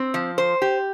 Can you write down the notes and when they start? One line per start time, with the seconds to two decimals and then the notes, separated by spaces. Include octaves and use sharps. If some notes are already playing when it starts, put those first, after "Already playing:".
Already playing: C4
0.14 F3
0.38 C5
0.62 G4